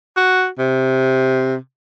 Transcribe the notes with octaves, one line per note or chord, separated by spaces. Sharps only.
F#4
C3